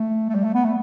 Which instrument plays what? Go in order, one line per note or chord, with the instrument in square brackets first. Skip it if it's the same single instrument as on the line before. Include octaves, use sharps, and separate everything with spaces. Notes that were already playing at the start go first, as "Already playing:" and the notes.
Already playing: [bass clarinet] A3
A3
G3
A3
B3
A3